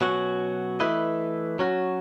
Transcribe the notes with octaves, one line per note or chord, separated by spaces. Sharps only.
B2 F#3 C#4 F#4
E3 A3 E4 B4 D#5
F#3 C#4 F#4